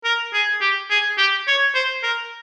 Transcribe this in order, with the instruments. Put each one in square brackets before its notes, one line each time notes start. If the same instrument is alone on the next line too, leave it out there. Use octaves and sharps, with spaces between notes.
[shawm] A#4
G#4
G4
G#4
G4
C#5
C5
A#4